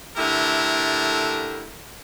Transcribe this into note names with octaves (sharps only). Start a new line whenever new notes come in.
D3 A3 E4 G4 A#4